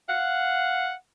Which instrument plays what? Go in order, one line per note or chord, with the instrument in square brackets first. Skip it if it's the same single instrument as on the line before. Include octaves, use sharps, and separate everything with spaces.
[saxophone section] F5 F#5